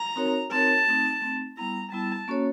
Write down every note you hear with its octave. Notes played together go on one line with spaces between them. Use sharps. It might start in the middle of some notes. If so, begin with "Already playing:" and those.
Already playing: A#5
C4 D#4 F#4 A#4 C#5
C4 D#4 F#4 A#4 C#5 A5
A3 C4 D#4
A3 C4 D#4
G3 B3 E4 A#5
G3 B3 E4 A5
A#3 C#4 F#4 A4 C#5